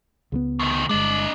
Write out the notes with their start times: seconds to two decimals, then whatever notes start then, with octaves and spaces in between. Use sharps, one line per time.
0.32 C#2 G3 B3
0.59 D2 D#3
0.89 G1 G#3 D4 D#5